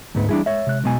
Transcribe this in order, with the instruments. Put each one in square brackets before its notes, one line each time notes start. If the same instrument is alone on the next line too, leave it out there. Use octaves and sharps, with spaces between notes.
[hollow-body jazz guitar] D2 G#2 B3 [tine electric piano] A3
[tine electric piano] E3 G3 [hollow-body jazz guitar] D4 E4 G#4
[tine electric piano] G#3 [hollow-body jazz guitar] C#5 E5
[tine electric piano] C3 G#3 F#6
[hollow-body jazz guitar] B1 B2 G#5 [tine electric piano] F#3 G#3 B3